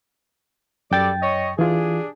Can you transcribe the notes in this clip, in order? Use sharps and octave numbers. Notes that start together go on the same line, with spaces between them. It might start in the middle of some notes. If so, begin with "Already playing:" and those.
F#2 G3 A4 D5 G5 A6
C#5 D#5
E3 D4 F4 G4 G#4